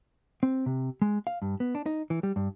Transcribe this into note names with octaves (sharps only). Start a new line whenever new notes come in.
C4
C3
G#3
F5
G2
B3
D4
D#4
E3
G3
G2